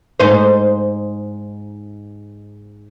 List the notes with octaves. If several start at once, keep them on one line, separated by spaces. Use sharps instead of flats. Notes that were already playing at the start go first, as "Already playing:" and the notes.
G#2 D#4 C5